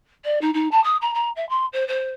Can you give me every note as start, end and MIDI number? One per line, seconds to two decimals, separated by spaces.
0.25 0.39 74
0.41 0.50 63
0.54 0.68 63
0.71 0.82 81
0.84 0.97 87
1.01 1.14 82
1.14 1.30 82
1.36 1.48 76
1.49 1.66 84
1.73 1.87 72
1.88 2.14 72